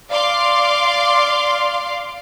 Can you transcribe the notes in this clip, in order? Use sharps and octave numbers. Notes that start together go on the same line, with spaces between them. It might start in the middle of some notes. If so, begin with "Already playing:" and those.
D5 F5 C6 D6